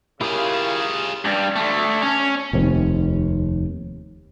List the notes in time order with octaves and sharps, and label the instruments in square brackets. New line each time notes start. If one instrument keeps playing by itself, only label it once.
[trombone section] C#3 [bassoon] A#3 [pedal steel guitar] E4 G4 D#6 [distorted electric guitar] F4 G#4
[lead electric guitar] G2 G3
D3 A3
C#4
[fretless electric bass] F1 D#2 C4